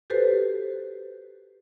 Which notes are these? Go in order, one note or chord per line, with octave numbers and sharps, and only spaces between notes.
F#4 G4 A4 B4 C5